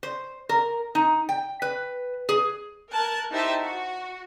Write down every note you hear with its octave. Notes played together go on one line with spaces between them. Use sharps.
C5
A#4
D#4
G5
B4
G#4
A#4 A5 F#6 G#6
D#4 E4 G4 C5 E5 A5
F#4